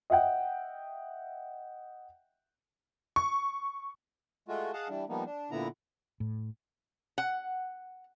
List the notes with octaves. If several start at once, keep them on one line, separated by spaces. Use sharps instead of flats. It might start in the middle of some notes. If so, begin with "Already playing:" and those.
D#5 E5 F#5 G5
C#6
G#3 A3 F4 F#4
G#4 D#5 F5 F#5 A5
E3 G3 D4
F3 G3 A#3 B3 D#4
D4
A#2 D3 B3 E4 A#5
A2
F#5